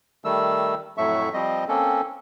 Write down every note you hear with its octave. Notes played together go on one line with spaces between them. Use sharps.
D#3 G3 A3 E6
F2 A2 F#3 A3 E5 C#6
F3 G3 C4 D#5
A#3 C4 C#4 A4